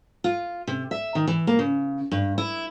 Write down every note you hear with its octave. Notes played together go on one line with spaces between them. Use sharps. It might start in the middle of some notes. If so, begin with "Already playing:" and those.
F4
C3
E5
D#3
E3
A#3
C#3
G2
E4